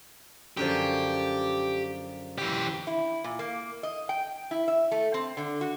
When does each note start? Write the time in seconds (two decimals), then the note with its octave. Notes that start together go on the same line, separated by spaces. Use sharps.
0.57 F#2 D3 F3 G4
2.38 E3 G4
2.87 E4
3.24 A#2
3.39 A#3
3.83 D#5
4.09 G5
4.51 E4
4.68 E5
4.92 A3
5.14 C4
5.37 D3
5.61 F#4